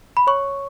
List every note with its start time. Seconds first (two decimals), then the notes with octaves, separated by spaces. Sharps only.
0.17 B5
0.27 C#5 C#6